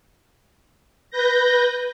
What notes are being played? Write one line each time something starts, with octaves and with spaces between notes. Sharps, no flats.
B4 G6 A#6